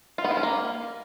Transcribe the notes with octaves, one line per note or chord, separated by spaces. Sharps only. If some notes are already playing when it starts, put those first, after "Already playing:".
F4
B3
E4
C#4
A#3